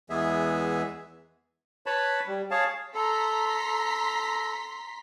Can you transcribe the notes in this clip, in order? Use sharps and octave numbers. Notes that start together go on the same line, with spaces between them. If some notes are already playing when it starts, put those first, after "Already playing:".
E2 E3 G#3 B3 G#4 E5
B4 C#5 A5 B5
G3
G#4 C#5 F5 A5
A4 A#5 C6 B6
A4